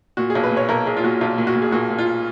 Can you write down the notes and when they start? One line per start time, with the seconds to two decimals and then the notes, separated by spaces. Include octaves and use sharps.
0.17 A#2 F#4
0.30 G#4
0.35 B1
0.43 B4
0.51 A#2
0.57 C#5
0.69 B1 A#4
0.86 B1 G#4
0.97 F4
1.04 A#2 F#4
1.21 B1 F4
1.38 A#2
1.47 F#4
1.56 A#2
1.62 G#4
1.72 A#2 F#4
1.90 A#2
1.99 F4